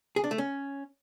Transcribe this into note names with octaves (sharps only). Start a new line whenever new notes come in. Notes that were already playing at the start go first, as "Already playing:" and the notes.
G#4
D4
A3
C#4